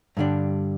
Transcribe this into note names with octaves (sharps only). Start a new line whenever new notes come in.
G2 D3 G3 D4